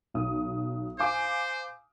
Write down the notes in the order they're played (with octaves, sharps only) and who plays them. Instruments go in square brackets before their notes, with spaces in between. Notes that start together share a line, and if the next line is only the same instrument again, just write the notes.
[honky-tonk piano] B1 D#6
[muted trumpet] C5 [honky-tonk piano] F5 G#5 D6